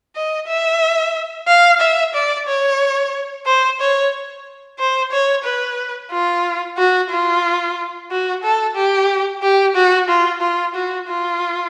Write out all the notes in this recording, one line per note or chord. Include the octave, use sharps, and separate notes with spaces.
D#5
E5
F5
E5
D5
C#5
C5
C#5
C5
C#5
B4
F4
F#4
F4
F#4
A4
G4
G4
F#4
F4
F4
F#4
F4